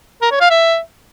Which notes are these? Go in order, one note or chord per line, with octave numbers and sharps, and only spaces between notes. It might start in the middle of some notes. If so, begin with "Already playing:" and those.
A#4
C#5
F5
E5